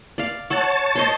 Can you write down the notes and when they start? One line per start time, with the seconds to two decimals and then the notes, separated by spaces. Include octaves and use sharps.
0.18 D5 F5
0.50 A4 C#5 F#5 A5
0.95 A4 C5 D#5